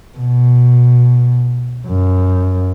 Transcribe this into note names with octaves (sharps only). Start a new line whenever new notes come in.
B2
F#2